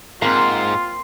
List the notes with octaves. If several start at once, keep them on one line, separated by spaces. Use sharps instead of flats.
G#2 A#3 C4 F4 C6 C7